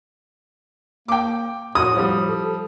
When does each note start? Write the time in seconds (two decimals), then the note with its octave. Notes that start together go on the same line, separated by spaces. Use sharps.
1.08 A#3 G5 D6
1.75 A2 F#4 D#6
1.96 F3 G3
2.29 A4